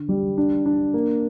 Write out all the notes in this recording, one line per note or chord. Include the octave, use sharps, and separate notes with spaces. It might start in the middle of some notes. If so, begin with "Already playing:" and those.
Already playing: D3
G3
D4
D4
A#3